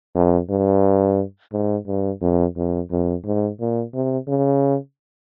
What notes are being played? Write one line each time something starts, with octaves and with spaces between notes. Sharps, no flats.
F2
G2
G#2
G2
F2
F2
F2
G#2
A#2
C3
C#3